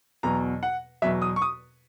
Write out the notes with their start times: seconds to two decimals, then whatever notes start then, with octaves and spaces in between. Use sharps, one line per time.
0.23 E2 B2 F#3 A#5
0.63 F#5
1.02 E2 B2 F#3 E5
1.22 D#6
1.36 C#6
1.42 D#6